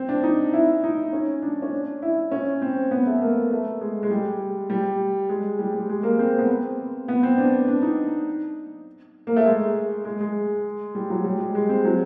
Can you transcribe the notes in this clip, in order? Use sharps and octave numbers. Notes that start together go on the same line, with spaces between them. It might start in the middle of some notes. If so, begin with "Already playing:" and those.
Already playing: C4
D4
D#4
E4
D#4
C#4
D4
C#4
D4
E4
C#4
C4
B3
A3
A#3
A3
G#3
G#3
G3
G3
G#3
G3
G3
G#3
A#3
C4
B3
C4
B3
C4
D4
D4
D#4
A#3
A3
G#3
G#3
G#3
G3
F#3
G3
G#3
G#3
C4
F#3